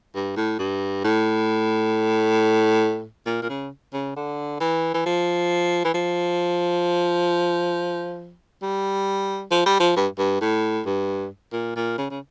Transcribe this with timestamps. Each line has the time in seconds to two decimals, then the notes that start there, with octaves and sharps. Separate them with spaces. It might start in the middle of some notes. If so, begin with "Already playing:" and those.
0.15 G2
0.37 A2
0.59 G2
1.04 A2
3.26 A#2
3.42 A#2
3.49 C#3
3.93 C#3
4.16 D3
4.60 E3
4.94 E3
5.06 F3
5.85 E3
5.94 F3
8.63 G3
9.51 F3
9.66 G3
9.80 F3
9.96 G2
10.18 G2
10.41 A2
10.86 G2
11.53 A#2
11.76 A#2
11.98 C#3
12.10 C#3